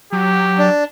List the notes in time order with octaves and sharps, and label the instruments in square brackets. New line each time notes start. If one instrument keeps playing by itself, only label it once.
[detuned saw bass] F#3 [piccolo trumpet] G4
[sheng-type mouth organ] D4